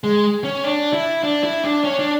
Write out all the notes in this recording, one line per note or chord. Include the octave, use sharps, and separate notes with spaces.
G#3
C#4
D4
E4
D4
E4
D4
C#4
D4